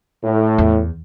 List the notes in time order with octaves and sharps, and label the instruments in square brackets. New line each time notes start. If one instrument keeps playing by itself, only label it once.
[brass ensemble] A2
[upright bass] E2